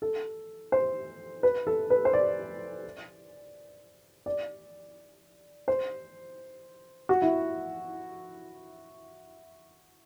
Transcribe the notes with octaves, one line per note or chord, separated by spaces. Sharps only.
A4
C5
B4
A4
B4
C5
D5
D5
C5
F#4
E4